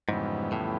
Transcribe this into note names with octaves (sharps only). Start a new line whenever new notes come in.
F2 G#2 C#3 E3 G3 B3
A2